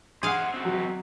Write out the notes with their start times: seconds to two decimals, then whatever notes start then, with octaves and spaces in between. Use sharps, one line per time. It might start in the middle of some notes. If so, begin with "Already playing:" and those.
0.23 G#4 C5 F5 F#5
0.54 C4 F#4
0.65 F#3